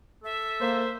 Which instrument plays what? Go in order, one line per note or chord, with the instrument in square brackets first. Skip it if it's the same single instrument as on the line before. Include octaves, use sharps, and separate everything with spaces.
[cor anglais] A4 [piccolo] E5
[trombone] A#3 [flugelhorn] C5